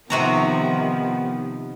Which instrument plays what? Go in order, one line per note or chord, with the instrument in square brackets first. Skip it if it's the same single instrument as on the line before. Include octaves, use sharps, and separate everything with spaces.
[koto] C3 F#4 A#5 [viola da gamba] D#3 F3 [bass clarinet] B3